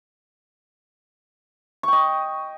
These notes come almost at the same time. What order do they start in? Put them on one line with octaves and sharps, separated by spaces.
C#6 G5 D#5